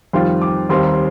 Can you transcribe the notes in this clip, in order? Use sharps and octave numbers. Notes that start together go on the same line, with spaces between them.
F2 D#3 G3 C4 F4 C6
D6
D#2 D#3 G3 C4 D#4 C6